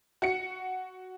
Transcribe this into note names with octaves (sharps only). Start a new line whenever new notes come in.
F#4 C#7